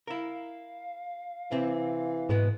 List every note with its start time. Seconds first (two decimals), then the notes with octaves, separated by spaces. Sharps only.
0.07 E4 A#4 F5
1.52 C3 E3 C4
2.29 G#2 B2 G#3 B3 B4